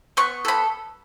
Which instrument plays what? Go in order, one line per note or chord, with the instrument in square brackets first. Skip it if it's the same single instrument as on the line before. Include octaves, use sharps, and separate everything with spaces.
[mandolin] B3 C#6
A4 B5